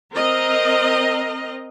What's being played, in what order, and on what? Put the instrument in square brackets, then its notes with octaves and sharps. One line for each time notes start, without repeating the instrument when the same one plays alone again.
[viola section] C4 A#4 D#5